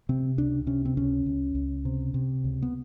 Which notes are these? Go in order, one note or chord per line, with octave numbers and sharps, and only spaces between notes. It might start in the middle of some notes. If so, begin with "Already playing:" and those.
C3 C4
C#2 D4
C3 C#4
C4
C#2 C#4
C#2
C#2
C3
C3
C#2
B3